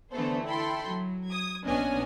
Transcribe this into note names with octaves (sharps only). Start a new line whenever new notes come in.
D3 E3 A3 B3 A4 C5
E4 A4 G5 B5 C6
F#3
D#6 G#6
A#1 B3 C#4 D4 D#5 G#5